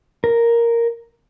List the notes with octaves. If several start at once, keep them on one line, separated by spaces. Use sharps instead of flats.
A#4